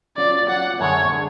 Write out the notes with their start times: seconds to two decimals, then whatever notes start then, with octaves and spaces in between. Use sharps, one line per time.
0.17 F#3 C#4 F4 D5
0.48 F#3 C#4 F4 F#5
0.80 F#2 D3 G#3 D4 G#4 C#5
1.12 D3 G#3 D4 G#4